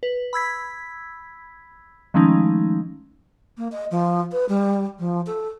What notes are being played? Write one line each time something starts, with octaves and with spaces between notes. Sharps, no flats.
B4
B5 E6 G#6 B6
D#3 F3 G#3 A3 C#4 D#4
A#3
D#5
F3
B4
G3
F3
A4